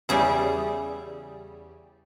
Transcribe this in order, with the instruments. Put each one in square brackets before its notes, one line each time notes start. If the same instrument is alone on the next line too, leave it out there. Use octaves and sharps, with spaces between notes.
[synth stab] E2 C#3 G3 [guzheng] E4 G#4